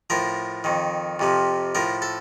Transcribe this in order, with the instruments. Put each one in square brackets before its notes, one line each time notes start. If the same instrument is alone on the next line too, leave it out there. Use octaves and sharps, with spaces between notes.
[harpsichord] A2 F3 A#4
F2 D#3
F2 C3 F3
A2 F3 A#4
A4